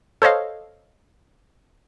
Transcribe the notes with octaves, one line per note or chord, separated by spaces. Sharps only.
A4 C5 C#5 D#5 F5